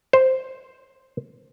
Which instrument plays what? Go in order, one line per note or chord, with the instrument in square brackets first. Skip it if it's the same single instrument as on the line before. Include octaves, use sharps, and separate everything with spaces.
[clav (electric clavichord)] C5